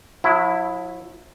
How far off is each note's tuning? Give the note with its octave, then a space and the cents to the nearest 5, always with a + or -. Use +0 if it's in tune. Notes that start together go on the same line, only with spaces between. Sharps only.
F#3 -45 E4 +0